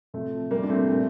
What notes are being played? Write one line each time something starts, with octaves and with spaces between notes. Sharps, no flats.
C3 F3 A3
C3 F3 G3 A#3
D4
A3 C4
A#2 F3